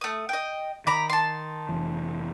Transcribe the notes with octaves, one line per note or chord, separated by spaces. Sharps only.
A3 D#6
D#5 G5
D#3 A#5 B5 D6
A5 C6
F1 E3